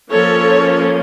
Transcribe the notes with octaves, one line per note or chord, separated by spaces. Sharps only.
F3 A#3 C#4 A4 C#5